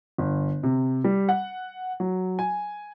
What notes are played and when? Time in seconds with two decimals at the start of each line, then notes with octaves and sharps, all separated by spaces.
0.18 G1
0.63 C3
1.04 G3
1.29 F#5
2.00 F#3
2.39 G#5